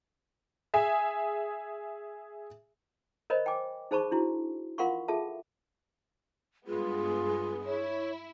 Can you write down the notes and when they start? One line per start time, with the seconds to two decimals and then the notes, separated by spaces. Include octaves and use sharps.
0.74 G#4 E5 G#5
3.30 A#4 C5 C#5 D#5 B5
3.46 G5 G#5 D6
3.91 D#4 G#4 C5 A5 B5 C#6
4.11 D4 E4 F#4
4.78 F4 A#4 F5 F#5 C6 C#6
5.08 F4 G#4 A4 E5 A5
6.67 G2 G#3 B3 F4 G#4
7.66 E4 C#5